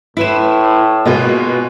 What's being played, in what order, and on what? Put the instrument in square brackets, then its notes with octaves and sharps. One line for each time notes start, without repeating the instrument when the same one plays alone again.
[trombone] A2 [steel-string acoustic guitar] E4 B4 C5 [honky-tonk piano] B6 E7
[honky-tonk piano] B2 G#3 A#3 [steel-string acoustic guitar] B3 F4 B4